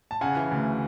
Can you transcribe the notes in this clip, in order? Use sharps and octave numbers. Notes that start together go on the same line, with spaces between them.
A5
C#3 F#5 G#5
E3
D2